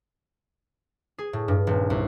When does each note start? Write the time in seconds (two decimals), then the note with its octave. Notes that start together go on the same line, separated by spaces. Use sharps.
1.18 G#4
1.33 A2
1.48 G2
1.67 D#1
1.90 C2